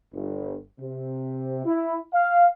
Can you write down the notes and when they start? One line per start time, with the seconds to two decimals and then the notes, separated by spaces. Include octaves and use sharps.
0.13 G1
0.80 C3
1.65 E4
2.14 F5